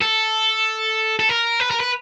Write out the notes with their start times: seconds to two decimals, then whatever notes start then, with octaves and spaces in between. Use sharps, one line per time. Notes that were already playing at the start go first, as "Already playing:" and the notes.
0.02 A4
1.19 A4
1.29 A#4
1.60 B4
1.71 A#4
1.80 B4